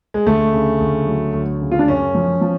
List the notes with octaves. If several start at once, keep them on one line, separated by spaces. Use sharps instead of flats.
G#3
D2 A3
C#3
D2
F#3
D2
C#3
F4
D4
F#2 C#4
F3
F3